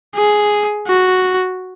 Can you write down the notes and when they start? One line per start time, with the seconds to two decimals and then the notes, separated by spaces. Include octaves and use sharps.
0.15 G#4
0.87 F#4